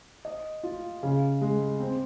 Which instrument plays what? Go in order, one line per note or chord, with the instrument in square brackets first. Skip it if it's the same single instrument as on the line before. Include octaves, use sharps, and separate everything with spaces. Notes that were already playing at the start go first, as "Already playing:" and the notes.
[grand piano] D#5
F4
C#3
G#3
C4